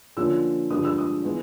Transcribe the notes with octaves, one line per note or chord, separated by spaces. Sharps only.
D3 F3 A#3 C#4 F4 E6
G2 D3 F3 G#3 D#6
E6
D#6
E3 G#3 B3